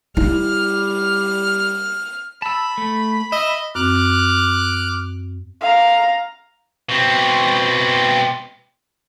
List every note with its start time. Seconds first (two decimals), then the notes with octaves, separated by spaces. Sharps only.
0.17 G3 E4 F6
2.42 A5 B5 E6
2.78 A3
3.32 D#5 E5
3.75 F#2 C4 D6 F6 F#6
5.61 F5 A#5
6.89 B2 C4